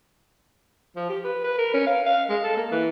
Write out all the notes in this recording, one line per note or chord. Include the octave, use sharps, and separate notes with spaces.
F3
G4
B4
B4
A#4
C#4
F5
F5
G#3
A4
A#3
E3